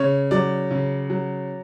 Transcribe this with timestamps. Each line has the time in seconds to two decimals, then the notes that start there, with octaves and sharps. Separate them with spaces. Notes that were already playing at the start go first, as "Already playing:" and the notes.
Already playing: C#3 C#5
0.31 F#3 D5
0.71 C#3
1.10 F#3